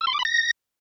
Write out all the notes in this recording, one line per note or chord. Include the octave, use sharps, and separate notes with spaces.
E6
C6
D6
B5
A#6